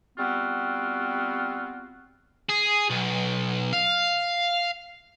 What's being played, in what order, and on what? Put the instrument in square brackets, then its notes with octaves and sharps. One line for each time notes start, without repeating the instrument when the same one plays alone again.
[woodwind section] G3 B3 C4 F4 F#4
[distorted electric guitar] G#4
B1
F5